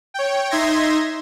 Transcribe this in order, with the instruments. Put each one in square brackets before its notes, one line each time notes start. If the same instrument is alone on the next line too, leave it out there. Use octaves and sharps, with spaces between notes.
[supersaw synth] C#5 G5
D#4 E5 C6 G#6 A#6